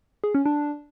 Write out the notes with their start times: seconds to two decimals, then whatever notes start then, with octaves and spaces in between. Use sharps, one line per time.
0.24 G#4
0.35 C#4
0.46 D4